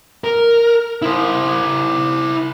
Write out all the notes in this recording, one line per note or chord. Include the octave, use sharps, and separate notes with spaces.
A#4
E4 C5